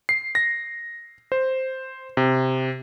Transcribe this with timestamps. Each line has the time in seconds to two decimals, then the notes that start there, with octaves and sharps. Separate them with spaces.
0.09 C7
0.35 A#6
1.32 C5
2.17 C3